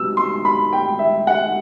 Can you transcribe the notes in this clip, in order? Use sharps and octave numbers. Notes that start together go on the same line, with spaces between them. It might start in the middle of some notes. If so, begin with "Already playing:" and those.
Already playing: C3 F#3 B3 E6
C6
B5
G5
E5
F#5